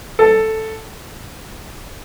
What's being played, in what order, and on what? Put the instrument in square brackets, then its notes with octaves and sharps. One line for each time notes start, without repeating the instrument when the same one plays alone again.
[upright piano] A4